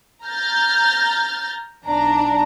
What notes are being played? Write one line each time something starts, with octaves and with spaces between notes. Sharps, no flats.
A#5 F6 G6 A6
B1 D4 A#5